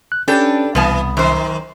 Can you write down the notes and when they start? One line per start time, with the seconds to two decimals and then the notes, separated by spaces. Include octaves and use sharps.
0.12 F#6
0.28 C#4 D4 G4 A4 B4
0.75 C2 B2 E3 B3 A5
1.17 F#2 D#3 C5